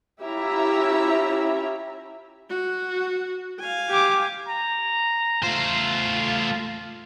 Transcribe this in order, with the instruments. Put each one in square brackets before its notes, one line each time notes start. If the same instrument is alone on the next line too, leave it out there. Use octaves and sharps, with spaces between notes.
[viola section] C#4 E4 F4 G4 E5 A#5
[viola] F#4
F5 G#5
[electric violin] G4 D6
[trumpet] A#5
[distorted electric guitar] A3 C5 [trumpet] F4